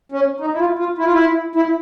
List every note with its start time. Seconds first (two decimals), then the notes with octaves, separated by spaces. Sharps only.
0.12 C#4
0.40 D#4
0.53 E4
0.59 F4
0.79 F4
0.98 E4
1.05 F4
1.12 E4
1.55 E4